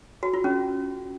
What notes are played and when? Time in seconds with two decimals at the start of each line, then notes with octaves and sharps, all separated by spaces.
0.23 F#4
0.33 F4
0.44 C#4